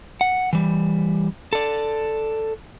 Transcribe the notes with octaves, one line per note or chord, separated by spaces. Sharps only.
F#5
E3 G3
A4 D5